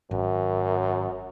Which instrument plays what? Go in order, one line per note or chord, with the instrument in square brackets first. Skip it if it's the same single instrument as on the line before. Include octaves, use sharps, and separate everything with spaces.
[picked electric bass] G#1 [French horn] F#2